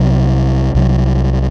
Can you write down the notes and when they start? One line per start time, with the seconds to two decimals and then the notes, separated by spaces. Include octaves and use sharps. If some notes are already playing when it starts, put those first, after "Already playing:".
Already playing: C2 C3 F#3
0.75 C2 C3 F#3